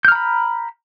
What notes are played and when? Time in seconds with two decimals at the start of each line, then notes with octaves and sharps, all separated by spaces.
0.05 G6
0.08 F6
0.12 A#5
0.15 B5